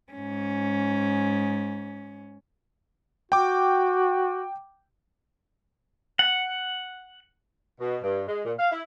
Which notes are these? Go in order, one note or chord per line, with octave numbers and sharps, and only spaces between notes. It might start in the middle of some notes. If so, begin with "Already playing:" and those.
G#2 C#4
F#4 G5 D6
F#5
B2
G2
G#3
A#2
F5
E4